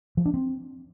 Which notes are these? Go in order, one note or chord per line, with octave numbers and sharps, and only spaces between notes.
F3
D4
C4